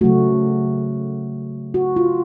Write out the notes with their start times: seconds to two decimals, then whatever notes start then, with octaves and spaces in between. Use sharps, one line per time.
0.01 C#3 F#3 A3 F#4
1.74 F#4
1.96 F4